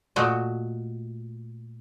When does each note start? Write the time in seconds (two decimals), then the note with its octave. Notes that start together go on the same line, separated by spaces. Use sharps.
0.16 A#2 A3 F#4 D#5